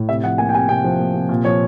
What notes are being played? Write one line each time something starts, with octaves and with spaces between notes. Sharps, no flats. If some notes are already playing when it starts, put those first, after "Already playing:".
Already playing: A2
C3 E5
F3 F#5
A#3 G#5
G5
C3 G#5
C3 G5
F3
A#3
C3
A#2
F3 C#5